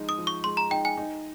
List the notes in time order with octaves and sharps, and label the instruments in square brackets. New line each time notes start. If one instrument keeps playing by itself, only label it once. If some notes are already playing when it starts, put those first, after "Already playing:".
Already playing: [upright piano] G#2 F3 G#3 D#4
[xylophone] D#6
[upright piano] F3
[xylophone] C#6
[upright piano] G#3 [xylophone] C6
[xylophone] A#5
[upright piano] D#4 [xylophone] G5
[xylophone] G#5
[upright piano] D#4